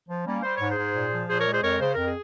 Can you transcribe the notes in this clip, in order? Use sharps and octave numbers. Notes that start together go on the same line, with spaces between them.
F3
G3 A#3 C#4
G3 C5
G#2 C#5
G#4 C5
G#2
A#2
F3
A#2 G#4 C5
A#4 C#5
G#3
G#4 C5
F2 A#4 C#5
C#3 C5
F2 A#4
G#4